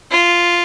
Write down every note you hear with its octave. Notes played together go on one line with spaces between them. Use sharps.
F4